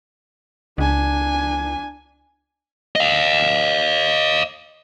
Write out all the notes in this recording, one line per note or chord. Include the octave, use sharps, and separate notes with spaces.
C#2 D4 G#5
D#5 F5